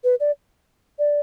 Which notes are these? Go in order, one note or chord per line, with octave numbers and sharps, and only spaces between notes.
B4
D5
D5